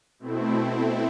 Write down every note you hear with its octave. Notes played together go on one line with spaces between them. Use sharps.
B2 A3 C4 E4